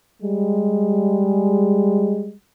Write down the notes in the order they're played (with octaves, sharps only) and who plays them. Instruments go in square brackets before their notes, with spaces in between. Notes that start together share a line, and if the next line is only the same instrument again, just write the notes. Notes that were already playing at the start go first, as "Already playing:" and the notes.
[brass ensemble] G3 G#3